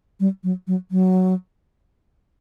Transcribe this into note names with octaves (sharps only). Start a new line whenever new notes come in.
G3
F#3
F#3
F#3